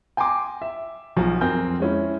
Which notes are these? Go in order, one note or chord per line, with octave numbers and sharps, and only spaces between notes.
G5 G#5 A#5 C6 D6
E5
B1 F3 F#4 G#4
F2 C4 A#4 G#5 G6
G#3 C#4 E4